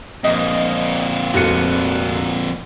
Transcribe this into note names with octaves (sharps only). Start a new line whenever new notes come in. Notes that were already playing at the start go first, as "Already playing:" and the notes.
F2 A#2 D#5
F1 F#4 C#7